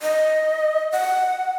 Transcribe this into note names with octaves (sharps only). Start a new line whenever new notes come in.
D#5
F#5